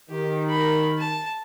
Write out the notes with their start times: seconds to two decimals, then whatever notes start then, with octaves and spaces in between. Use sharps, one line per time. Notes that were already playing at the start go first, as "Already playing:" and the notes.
0.10 D#3 G4
0.49 A#4 B5
0.98 A5